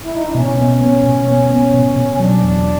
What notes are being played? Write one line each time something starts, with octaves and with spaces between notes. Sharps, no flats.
E4
D#4
D4
B2 C#4
B3
B3
B2
B3
B3
B2
B2
C#4
F#3 D4
E2